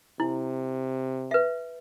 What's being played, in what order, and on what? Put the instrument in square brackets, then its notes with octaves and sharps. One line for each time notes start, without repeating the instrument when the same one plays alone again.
[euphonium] C3 [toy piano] E4
[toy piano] B4 E5